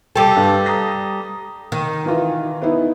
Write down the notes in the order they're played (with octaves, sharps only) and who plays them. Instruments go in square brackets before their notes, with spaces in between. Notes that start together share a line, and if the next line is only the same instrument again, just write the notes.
[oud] G3 A4 [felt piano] G5 D6
[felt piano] G2
A#5 D#6 A#6
[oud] D#3
[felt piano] E3 F4
B3 D#4 E4